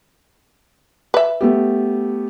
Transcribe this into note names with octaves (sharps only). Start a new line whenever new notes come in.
B4 E5
A3 B3 G4